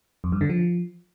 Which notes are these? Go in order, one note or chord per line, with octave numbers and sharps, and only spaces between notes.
F2
G2
D3
F3